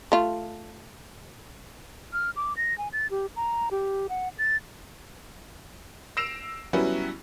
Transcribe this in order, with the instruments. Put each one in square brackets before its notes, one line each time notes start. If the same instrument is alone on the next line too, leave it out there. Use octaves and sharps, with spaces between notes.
[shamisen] A3 F4
[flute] F6
D6
A#6
G#5
A6
G4
A#5
G4
F#5
A6
[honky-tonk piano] E6 A#6 C7 D7 E7 F7
F#3 G3 B3 C#4 E4 F#4